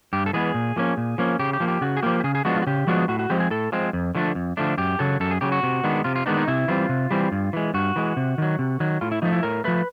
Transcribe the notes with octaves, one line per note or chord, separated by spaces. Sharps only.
G2 G4
A4
E3 G#3 B3 G#4
A#2
F3 A#3 C#4
A#2
F3 A#3 C#4
C#3 G4
G4
F3 A#3
G4
C#3 F#4
G#4
F3 A#3 G4
G4
C#3 G#4
G#4
F3 G#3 B3 D4 F#4
F4
F#4
C#3 G4
F3 G#3 B3 D4 F#4
A2 F#4
F#4
F3 G#3 C4 G4
G#4
A2 A4
F3 G#3 C4
F2
D3 F3 A3 D4
F2
D3 F3 A3 D4
F#2 G4
C#3 F#3 A4
F#2 A4
G#4
C#3 F#3 G4
F#4
C3
D#3 G#3 B3 D4
C3 F4
F4
D#3 G#3 B3 D4 D#4
D#4
C3 E4
E3 G3 C4 F4
C3
E3 G3 C4
G2
E3 G#3
G2 F#4
E3 G#3
C3
D#3 F#3
C3
D#3 F#3
A2 F4
E4
F3 A3 D#4
E4
A2 A#4
F3 A3 B4